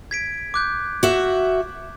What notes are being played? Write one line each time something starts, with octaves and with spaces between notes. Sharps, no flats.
G#6 B6 D7
D6 F#6 G6
F#4 E5